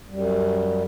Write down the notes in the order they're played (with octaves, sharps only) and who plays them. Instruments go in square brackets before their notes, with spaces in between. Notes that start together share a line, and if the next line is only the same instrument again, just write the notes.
[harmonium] F#2 G3